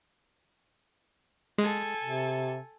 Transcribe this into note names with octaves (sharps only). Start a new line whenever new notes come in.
G#3 A4 G#5
C3